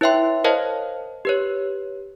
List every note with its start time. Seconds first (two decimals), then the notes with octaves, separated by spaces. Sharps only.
0.01 E4 B4 C#5 E5 G5 C6
0.44 A#4 C5 C#5 D#5 F5 A5
1.25 G4 B4 C#5